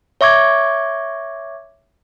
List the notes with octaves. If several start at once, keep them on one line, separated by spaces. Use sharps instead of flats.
C#5 E5 C#6 D6 G#6